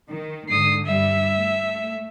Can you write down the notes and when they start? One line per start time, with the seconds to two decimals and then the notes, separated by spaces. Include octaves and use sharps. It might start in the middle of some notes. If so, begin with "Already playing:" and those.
0.10 D#3
0.49 G#2 D3 D#6 C7
0.86 G2 G3 E5
1.35 A3